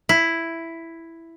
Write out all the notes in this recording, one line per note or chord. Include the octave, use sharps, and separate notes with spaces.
E4